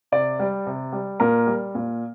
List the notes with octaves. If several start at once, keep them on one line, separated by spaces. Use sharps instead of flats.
C3 D5
G3
C3
G3
A#2 A#4
G3
A#2